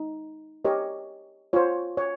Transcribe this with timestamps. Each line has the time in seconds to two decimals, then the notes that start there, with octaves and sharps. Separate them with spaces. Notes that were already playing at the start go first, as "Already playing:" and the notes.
Already playing: D#4
0.65 G4 A#4 C#5 D#5
1.53 F4 C5 C#5
1.97 C#5